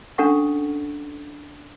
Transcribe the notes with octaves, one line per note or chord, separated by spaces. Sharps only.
C#4 D4 A4 F#5 C#6